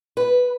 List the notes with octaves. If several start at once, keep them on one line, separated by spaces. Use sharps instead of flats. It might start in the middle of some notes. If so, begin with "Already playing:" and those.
B4